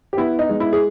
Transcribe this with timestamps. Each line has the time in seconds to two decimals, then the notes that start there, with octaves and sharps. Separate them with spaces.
0.13 G4
0.17 B3 E4
0.39 D#4
0.49 G#3
0.60 E4
0.73 G#4